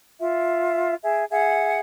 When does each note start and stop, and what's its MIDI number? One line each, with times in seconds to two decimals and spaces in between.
0.19 0.94 65
0.19 0.94 76
1.02 1.23 68
1.02 1.23 76
1.30 1.80 68
1.30 1.80 76
1.30 1.80 78